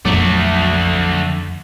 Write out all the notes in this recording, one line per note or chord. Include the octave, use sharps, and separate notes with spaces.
A#1 F2 D3 F#3 A3 D6